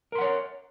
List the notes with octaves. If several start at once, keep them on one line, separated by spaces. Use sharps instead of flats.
A#4 C#5 F#5 C6